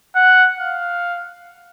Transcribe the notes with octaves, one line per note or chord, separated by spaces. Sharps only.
F#5
F5